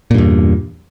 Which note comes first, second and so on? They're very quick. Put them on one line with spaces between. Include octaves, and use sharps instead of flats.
A#2 G2 E2